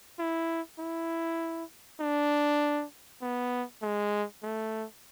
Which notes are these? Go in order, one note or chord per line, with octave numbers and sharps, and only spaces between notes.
E4
E4
D4
B3
G#3
A3